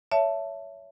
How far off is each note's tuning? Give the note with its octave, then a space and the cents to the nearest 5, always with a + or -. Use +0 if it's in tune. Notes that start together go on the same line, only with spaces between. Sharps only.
C#5 +20 E5 +15 A5 +0